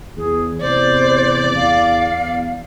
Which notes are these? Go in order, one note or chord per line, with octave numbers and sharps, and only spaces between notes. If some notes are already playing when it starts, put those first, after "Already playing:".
E2 G#4
E2 A2 C3 C5 D5
E2 F5